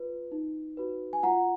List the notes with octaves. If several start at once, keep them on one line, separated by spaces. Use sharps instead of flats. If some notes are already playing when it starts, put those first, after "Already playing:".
Already playing: F4 B4
D#4
F#4 B4
G#5
F4 F#5 A#5